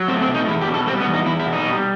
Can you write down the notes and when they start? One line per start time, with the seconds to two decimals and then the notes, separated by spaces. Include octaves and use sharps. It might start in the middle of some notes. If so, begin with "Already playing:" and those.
Already playing: F#3
0.08 A3 C4
0.22 C4
0.28 B2
0.35 D#4
0.48 E2 E4
0.61 G4
0.68 B2
0.74 A4
0.87 G3 C4
1.00 B3
1.07 E2
1.14 D#4
1.26 E2 E4
1.39 E4
1.46 B2
1.53 D#4
1.66 G3